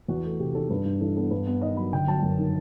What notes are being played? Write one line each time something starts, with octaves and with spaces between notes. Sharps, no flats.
E2 F#4
A3
C3 G4
D#3 A4
G2 B4
G2
E3 A4
B3 A4
G2 B4
B3
D#3 D#5
F#3 B5
G1 G5
F#3 A5
F#2
D#3